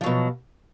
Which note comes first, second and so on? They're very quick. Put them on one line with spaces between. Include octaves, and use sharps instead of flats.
F3 F#3 B2